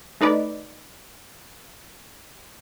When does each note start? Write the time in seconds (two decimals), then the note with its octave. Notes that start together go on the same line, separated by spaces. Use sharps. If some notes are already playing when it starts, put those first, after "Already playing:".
0.21 A3 D#4 B4 D5